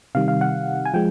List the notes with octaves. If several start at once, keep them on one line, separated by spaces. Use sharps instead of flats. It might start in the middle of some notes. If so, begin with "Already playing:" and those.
C3 D#3 G3 F5
F5
F#5
G#5
F3 G#3 G5